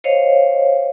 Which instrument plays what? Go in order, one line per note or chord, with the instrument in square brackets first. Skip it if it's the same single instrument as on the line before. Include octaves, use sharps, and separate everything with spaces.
[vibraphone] C5 C#5 D#5 F5